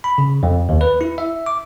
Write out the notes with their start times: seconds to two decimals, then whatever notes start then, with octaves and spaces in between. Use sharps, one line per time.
0.04 B5
0.18 C#3
0.43 F2
0.69 D#2
0.81 B4
1.01 E4
1.18 E5
1.46 D6